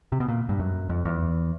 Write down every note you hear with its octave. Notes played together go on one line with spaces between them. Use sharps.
C3
B2
A#2
G2
F#2
F2
E2